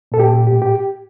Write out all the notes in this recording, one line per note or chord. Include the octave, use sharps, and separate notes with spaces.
A#2 A4
G4
A#2
A2 G4
G4